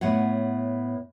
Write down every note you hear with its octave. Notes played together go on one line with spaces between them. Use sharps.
A2 B3 C#5 F#5